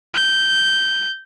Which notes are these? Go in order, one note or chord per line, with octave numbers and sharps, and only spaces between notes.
G6